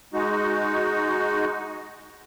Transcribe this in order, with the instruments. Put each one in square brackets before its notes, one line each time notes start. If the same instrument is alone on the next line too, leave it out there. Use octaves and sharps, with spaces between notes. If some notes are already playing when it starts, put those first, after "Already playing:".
[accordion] G#3 D#4 F#4